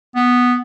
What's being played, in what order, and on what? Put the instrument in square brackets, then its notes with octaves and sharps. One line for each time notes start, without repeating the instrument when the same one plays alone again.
[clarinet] B3